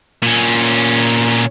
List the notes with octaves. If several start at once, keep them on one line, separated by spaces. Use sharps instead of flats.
A#2 C#4